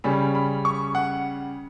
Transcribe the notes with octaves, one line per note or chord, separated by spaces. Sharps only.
C#3 G3 C#4 B5
B5
C#6
F#5